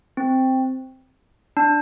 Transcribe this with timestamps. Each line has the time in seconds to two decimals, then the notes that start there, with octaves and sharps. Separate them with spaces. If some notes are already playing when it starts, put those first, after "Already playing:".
0.17 C4
1.57 D4